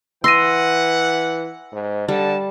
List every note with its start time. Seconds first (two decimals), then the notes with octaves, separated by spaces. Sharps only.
0.24 E3 F#5 C6 E6 A#6 D#7
1.72 G#2
2.08 D3 G3 A5